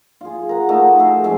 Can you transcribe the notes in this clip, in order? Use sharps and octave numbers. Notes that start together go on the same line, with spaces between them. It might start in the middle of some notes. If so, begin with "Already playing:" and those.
F4 G#4
A#4 F#5
A3 D#4 F#4
G#4 E5
F3 G#3 C4 C#4